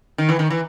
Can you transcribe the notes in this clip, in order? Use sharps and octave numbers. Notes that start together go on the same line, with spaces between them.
D#3
E3
D#3
E3